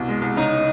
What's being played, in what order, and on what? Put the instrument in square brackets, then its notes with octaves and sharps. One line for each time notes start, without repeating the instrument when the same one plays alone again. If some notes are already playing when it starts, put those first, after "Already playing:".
Already playing: [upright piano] C2 B2
G#3
C2
[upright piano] C#3 [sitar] D#4